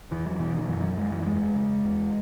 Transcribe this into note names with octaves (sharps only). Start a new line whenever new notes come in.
E2 E3
F#3
B2 E3
D#3
F#2 E3
F#3
F#2 G#3
E3
E2 G#3
C#3
E2